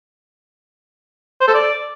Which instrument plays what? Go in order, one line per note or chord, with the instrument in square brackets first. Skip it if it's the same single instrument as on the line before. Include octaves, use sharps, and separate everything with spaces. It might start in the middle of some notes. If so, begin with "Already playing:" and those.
[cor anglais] C5
A4
D5